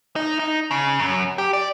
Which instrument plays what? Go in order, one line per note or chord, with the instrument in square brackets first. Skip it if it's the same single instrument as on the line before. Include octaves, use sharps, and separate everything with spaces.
[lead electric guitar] D#4
D#4
C#3
F#2
G4
D5